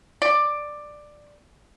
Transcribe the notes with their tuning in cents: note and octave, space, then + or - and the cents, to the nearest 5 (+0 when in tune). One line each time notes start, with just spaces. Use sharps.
D5 +10